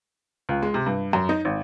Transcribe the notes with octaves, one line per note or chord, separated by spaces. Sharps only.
C#2
G#3
C3
G2
F#2
D#4
G#1